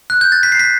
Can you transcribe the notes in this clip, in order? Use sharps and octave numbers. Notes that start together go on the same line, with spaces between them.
F#6
G6
A6
B6
C7
B6